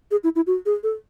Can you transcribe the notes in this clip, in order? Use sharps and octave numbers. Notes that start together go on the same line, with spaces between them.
G#4
E4
E4
F#4
G#4
A4